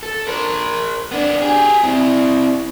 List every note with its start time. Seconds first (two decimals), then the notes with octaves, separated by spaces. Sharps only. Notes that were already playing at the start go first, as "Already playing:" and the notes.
0.03 A4
0.27 A#4 C5
1.11 B3 D4
1.42 G4 G#4
1.83 C4 E4